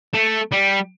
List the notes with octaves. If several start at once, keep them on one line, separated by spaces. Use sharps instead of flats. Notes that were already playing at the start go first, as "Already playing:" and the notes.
A3
G3